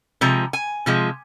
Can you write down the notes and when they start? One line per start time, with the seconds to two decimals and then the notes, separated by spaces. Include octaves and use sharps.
0.21 C3 F3 G#3 A#5
0.53 G#5
0.86 C3 F3 G#3